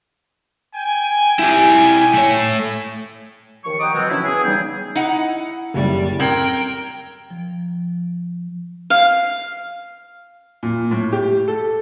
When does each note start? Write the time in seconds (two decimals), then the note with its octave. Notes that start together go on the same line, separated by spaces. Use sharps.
0.74 G5 G#5
1.39 E4 G4
2.15 A3 C#5
3.64 D#2 D#3 F3 C#6
3.80 D#5 F#5 G5 A#5 D6 D#6
3.94 B2 D3 F3 F#3 G#3 C4
4.10 F#3 C#4 D4 E4
4.25 B3 G#4
4.44 C#3 E3 G3 D#4 G#4 G5
4.95 D#4 E4 F#5
5.74 F#1 G3
6.20 C4 A#4 G5 G#6 F#7
7.30 F3
8.90 F5
10.63 A#2
10.91 A2
11.13 G4
11.48 A4